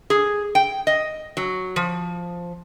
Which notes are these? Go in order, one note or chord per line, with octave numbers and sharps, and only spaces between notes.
G#4
G5
D#5
F#3
F3